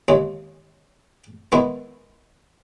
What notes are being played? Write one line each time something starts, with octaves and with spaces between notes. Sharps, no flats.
D#2 C#3 G#3
D#3 G#3 B3 E4